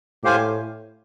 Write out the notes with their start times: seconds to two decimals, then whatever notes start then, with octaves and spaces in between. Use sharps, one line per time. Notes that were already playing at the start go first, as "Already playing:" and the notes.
0.24 A2 G4 C5 F5 G#5